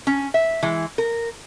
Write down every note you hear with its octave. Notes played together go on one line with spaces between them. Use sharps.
C#4
E5
E3 G#3
A#4